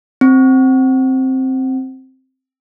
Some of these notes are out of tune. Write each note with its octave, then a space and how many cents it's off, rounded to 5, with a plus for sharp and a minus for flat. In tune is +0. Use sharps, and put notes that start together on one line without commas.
C4 +5